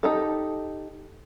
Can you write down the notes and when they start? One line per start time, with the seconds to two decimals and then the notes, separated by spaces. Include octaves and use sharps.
0.03 D#4 G4 A4